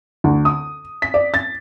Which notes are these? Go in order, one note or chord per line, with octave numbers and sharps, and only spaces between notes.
D2
D#6
B6
D5
A6